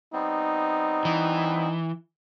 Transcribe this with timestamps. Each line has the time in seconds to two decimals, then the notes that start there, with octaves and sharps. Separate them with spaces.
0.13 G3 B3 C4 D#4
1.05 E3